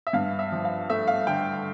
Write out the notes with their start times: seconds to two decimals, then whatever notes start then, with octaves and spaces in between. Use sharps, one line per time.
0.07 E5
0.13 G2 F5
0.39 E5
0.52 F3
0.65 F5
0.90 A3 E5
1.07 F5
1.27 D3 G5